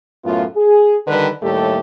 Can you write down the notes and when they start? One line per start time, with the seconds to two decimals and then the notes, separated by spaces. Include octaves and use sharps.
0.24 F#2 A2 A3 B3 F4
0.56 G#4
1.07 D3 D#3 G3 B4
1.42 D#2 A2 G3 A3 G4 A4